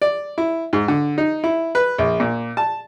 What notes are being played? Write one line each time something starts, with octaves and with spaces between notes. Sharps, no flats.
D5
E4
G#2
D3
D#4
E4
B4
A#1
A#2
A5